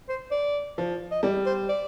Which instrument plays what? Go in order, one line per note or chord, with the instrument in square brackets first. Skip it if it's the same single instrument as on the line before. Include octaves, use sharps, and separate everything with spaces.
[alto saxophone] C5
D5
[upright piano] F3
[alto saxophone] D#5
[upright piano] G3 [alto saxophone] D5
[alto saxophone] C5
D5